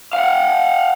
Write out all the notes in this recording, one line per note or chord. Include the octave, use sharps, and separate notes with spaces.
F5 F#5